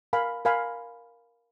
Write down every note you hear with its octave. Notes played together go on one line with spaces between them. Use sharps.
A#4 F5 G#5 B5
A#4 F5 G#5 B5